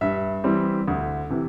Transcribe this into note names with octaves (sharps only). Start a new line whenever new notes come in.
G2 E5
E3 G3 C4
D2
C3 E3